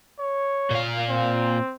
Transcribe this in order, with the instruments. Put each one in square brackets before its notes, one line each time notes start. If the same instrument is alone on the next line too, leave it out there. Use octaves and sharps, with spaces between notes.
[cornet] C#5
[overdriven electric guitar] A#2 F5
[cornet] C4